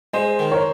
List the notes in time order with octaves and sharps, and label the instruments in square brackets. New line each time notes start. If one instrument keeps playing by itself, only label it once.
[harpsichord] G#3 [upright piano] C5 D#5
[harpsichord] D#3
[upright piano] A#4 C#5